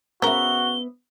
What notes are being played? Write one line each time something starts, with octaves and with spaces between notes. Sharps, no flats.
C#3 B3 F#4 A#4 E5 G7